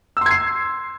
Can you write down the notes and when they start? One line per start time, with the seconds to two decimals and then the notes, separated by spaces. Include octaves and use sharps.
0.17 E6
0.21 C6
0.26 G#6
0.31 C7